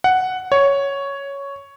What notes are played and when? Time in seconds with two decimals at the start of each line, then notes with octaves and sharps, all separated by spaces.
0.04 F#5
0.52 C#5